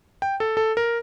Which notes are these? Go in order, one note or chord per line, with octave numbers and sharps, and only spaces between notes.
G5
A4
A4
A#4